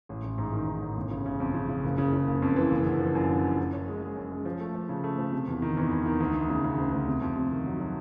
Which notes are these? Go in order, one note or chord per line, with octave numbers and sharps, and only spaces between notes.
A1
A1
G#2
D#3
G#2
A1
G1
C#3
C#3
F2
C#3
C#3
F#1
C#3
C#3
F#1
F2
E3
F#1
D3
F3
F#2
D3
F3
F#2
C#4
G#3
G#3
F#2
G#3
F3
A3
F3
C#3
A3
F3
C3
E2
D#3
E2
E2
D#3
D2
D2
C#3
C#3
D2
D2
C3
F2
C3
D#3
F#3
F#3